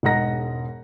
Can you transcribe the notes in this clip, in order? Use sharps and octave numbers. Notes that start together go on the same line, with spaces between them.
E1 G#2 D#5 F#5 A#5 A#6